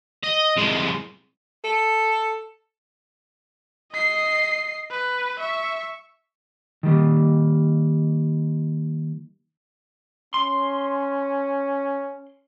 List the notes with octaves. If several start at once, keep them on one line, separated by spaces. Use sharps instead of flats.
D#5
C2 G#3
A4
D#5 C7
B4
E5 C#6
D#3 G3 A#3
C#4 C6